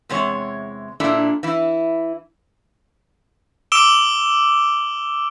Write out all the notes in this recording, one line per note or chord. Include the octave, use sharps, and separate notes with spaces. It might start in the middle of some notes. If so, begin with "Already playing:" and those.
E2 C3 G#3 C#5
A#2 D4 E4 A4 E5
E3 E4
D6 E6 D7 E7 G7